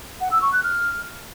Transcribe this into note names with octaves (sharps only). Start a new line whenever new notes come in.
F#5
E6
C#6
F#6
F6